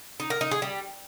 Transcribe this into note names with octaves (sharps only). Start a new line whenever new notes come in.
D#4
A#4
D#4
G#4
G3